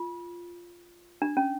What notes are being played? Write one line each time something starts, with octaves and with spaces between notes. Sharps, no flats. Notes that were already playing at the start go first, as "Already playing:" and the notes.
Already playing: F4
D4
C#4